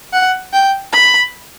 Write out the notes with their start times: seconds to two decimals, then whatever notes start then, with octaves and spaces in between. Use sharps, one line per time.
0.13 F#5
0.53 G5
0.93 B5